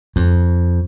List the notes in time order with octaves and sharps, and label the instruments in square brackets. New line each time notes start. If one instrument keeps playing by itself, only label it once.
[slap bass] F2